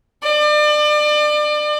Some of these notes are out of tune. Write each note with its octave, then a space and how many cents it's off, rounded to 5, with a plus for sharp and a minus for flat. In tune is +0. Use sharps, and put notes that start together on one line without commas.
D5 +35